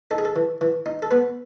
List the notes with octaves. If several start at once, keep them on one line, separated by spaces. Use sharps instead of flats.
D#4 A4
G#4
A4
E3
E3
D#4
A4
B3 B4